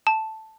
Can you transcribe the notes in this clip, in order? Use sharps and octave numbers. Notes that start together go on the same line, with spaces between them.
A5